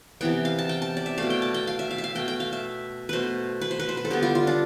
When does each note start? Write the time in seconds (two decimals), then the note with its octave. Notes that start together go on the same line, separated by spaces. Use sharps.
0.21 C3 E3 B3 G5
0.45 F5
0.59 A5
0.69 G5
0.82 A5
0.97 D5
1.06 E5
1.18 B2 A3 F5
1.30 G5
1.42 A5
1.54 G5
1.67 F5
1.79 E5
1.91 F5
1.98 E5
2.04 F5
2.15 B2 A3 G5
2.28 G5
2.40 F5
2.53 E5
3.09 B2 A3 B4 C5
3.61 B4
3.71 C5
3.80 B4
3.89 C5
3.97 B4
4.05 A4
4.10 D3 G3 B3 G4
4.23 F4
4.35 F4
4.47 D4